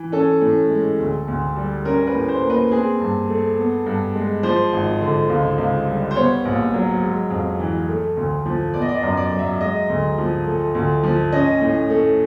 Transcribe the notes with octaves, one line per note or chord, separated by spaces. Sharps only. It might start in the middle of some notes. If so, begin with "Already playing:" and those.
Already playing: E3
C#4 A4
A2
G#3
D2
D2
G3
C#4 A#4
B4
A2
C5
A#3
B4
C4 G#4
G2
A3
B3
G2
G#3
F3 C5
G#1
D3
C#2
C#2
G3
C5
B3 C#5
A#1
F#3
G#3
F2
E3
A3
D2
F3
B3 D5
D#5
D5
D#5
F#2
D5
F#3
E5
G#3 D#5
D2
F3
A3
D2
F3
C#4 D#5
A2
A3